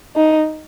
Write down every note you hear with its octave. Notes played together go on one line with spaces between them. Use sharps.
D#4